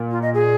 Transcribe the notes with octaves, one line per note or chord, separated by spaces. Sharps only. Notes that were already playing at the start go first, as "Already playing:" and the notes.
Already playing: A#2
F4
D#5
G#4